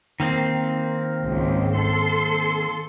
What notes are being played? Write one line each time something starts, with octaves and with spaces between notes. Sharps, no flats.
D#3 A#3 C4
G#1 C#2 G#2
A4 C6